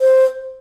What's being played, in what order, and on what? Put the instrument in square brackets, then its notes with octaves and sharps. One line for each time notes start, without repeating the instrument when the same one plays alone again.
[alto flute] C5